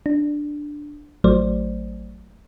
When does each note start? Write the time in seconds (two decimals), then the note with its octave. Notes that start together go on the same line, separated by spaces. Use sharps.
0.06 D4
1.24 A1 F#3 A3 C5 D5